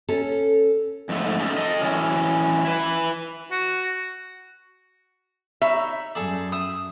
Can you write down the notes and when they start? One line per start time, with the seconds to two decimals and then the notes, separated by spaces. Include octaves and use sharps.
0.09 C#4 A4
1.09 F2 G#2 A3
1.40 A3 C#4 D#4 F4 G#4 A4
1.58 A4 D#5
1.82 F#2 B2 E3 C#4
2.65 E4 B4
3.51 F#4
5.62 D#4 C#5 E5 B5
6.15 F#2 G#4 A4 D5
6.52 E5 D#6